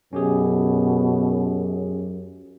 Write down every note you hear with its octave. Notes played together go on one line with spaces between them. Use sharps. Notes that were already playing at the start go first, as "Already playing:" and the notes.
F#2 B2 C#4 G4 G#4